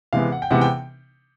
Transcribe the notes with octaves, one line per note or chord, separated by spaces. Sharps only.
C3 E3 G#3 B3 F5
F#5
G5
C3 E3 G#3 B3 F#5
G5